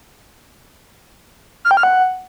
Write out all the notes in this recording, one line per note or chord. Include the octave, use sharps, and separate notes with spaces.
F6
G5
F6
F#5